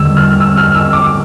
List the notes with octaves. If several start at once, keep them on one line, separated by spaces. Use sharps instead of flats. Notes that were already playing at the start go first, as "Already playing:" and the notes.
Already playing: E2 D3 G3 E6
F6
E6
F6
E6
D6